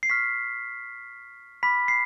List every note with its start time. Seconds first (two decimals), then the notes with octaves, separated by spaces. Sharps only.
0.03 C7
0.10 C#6 F6 B6
1.63 B5 D6 F6 B6
1.88 C7